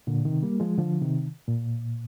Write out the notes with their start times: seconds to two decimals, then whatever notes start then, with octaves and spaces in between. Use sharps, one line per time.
0.07 A#2 D3
0.25 C3 D#3
0.43 G3 A#3
0.60 F3 G#3
0.78 D3 F3
1.01 C3 D#3
1.48 A#2